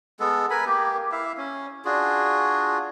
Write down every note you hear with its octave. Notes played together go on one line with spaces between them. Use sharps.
G#3 B3 A4
A#4 B4 G#5 B5
A#3 G4
E4 E5 F5
C#4
D4 F4 F#4 G#4